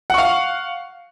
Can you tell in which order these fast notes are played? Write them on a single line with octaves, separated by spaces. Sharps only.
F#5 C#6 F5